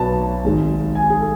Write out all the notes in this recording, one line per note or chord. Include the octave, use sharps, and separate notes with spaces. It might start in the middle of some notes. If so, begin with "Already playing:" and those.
Already playing: B1 B2 F#3 B4 D5 A5
G#1 G#2 G#3
G#5
G#4
A4